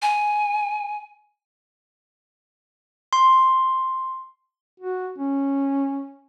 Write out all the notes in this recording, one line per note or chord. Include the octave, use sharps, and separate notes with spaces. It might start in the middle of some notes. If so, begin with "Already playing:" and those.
G#5
C6
F#4
C#4